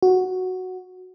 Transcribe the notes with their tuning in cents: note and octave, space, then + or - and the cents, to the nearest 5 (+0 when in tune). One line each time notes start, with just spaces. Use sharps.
F#4 +0